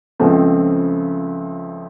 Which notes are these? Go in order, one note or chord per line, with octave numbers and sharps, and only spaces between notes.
C#2 C#3 F3 A3 C4